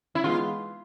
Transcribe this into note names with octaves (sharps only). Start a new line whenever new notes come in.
E4
E3 G#3 B3 D#4 F4